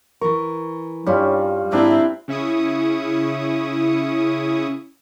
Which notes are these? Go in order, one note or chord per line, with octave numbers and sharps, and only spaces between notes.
E3 A#4 C#6
G2 G3 C#4 E4 F4 C#5
G#2 C4 D4 E4 C5 D5 E5
C#3 C#4 E4 C#6 D#6